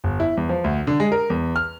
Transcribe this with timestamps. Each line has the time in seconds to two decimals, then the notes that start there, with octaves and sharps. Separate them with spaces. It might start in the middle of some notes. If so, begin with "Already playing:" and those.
0.04 G1
0.20 E4
0.37 E2
0.49 F3
0.64 D2
0.87 D3
1.00 G#3
1.12 A#4
1.30 E2
1.56 F6